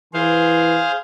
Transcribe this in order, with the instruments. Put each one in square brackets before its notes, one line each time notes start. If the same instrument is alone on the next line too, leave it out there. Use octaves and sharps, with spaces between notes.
[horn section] E3 [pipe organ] G#4 C5 F5